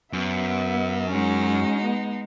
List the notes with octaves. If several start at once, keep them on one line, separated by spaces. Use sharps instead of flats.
F#2 B3 E5
G#3 C#4 D#4 F#4
B3